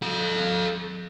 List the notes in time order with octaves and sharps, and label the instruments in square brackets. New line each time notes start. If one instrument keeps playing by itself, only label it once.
[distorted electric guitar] A4 F5